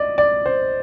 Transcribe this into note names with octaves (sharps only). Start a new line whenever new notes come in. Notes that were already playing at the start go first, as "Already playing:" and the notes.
Already playing: D5 D#5
D5
C5